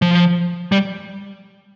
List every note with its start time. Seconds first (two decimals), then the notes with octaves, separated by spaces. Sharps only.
0.02 F3
0.72 G3